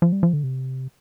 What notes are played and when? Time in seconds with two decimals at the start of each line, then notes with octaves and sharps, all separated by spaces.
0.02 F3
0.12 G3
0.23 F3
0.33 D3
0.43 C3